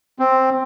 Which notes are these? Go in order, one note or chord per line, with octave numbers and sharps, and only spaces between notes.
C4